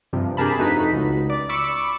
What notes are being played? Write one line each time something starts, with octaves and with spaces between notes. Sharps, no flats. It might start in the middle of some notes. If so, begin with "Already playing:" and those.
G2 C3 F3
D4 G4 G#4 A#4 A5 B5
F2 A3 D#4 F#4 B4 B6
C#2
D5
B5 C#6 D6 E6 C#7